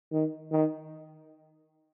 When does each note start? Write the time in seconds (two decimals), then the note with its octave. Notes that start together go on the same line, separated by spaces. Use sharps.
0.12 D#3
0.52 D#3